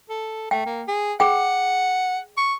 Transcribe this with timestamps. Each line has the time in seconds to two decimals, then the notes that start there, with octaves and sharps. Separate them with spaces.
0.09 A4
0.51 A3 G5
0.66 A#3
0.88 G#4
1.20 G#4 F#5 G5
2.37 C#6